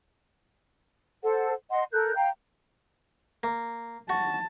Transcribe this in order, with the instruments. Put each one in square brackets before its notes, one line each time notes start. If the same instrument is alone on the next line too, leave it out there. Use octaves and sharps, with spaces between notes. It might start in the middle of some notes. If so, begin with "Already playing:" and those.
[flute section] A4 C5 F#5
D#5 F#5 C6
A4 A#4 F#6 G6
F5 G5 A#5
[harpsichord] A#3
[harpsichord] F#4 [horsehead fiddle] A5